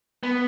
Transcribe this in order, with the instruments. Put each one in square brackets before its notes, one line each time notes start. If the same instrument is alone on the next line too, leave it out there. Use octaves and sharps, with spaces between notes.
[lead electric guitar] B3